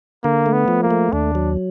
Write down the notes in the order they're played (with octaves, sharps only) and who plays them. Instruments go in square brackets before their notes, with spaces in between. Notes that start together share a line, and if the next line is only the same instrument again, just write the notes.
[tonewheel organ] D3 [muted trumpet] A#3
[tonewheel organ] A3
[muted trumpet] B3
[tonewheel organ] F3
[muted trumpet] A#3
[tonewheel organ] A3
[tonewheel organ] D#2 [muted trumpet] D4
[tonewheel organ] F#3